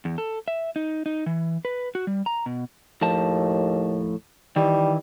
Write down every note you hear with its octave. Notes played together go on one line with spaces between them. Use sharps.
E2
A4
E5
D#4
D#4
E3
B4
F#4
G3
A#5
B2
D#2 A2 F3 A5
D#3 E3 G3